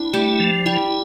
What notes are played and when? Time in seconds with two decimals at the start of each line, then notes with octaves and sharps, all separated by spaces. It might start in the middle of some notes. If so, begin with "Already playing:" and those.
Already playing: C4 D4 E4
0.13 G3 A3 G4
0.40 F3
0.66 G3 E4 G4